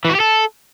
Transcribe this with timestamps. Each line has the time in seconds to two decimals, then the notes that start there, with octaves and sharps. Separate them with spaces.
0.05 E3
0.10 F#4
0.15 G4
0.20 A4